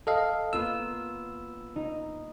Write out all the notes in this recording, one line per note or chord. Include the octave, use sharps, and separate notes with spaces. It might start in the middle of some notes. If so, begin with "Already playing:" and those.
A4 D#5 F5
A#3 B3 F4 E6
D#4